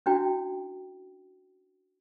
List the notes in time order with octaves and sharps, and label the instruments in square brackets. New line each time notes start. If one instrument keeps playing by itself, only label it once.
[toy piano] C#4 D4 E4 F#4 G5